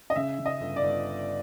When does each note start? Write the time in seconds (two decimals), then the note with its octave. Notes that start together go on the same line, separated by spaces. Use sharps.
0.10 D#5
0.16 C#3 E5
0.38 C#3
0.46 D#5
0.60 G1
0.76 D5
0.83 G1